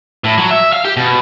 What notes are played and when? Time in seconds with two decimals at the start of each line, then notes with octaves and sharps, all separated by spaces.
0.24 A2
0.38 F#3
0.51 E5
0.73 F5
0.85 G4
0.97 B2